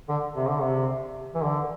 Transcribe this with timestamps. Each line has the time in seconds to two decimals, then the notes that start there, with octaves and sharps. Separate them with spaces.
0.09 D3
0.35 C3
0.49 D3
0.62 C3
1.35 E3
1.43 D3